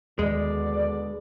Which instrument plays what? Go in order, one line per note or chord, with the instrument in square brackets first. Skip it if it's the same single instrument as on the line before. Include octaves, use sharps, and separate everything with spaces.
[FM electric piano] D#2 [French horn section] B2 D3 D5 [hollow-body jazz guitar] G#3